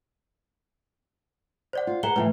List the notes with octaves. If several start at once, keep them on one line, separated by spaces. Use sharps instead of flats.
C5 D5 F#5
F4
G#4 B4 F#5 A#5 G7
A2 D#3 E3 B4